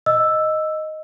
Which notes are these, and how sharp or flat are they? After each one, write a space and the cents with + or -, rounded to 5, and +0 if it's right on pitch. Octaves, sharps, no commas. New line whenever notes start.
D#5 +0 E6 +0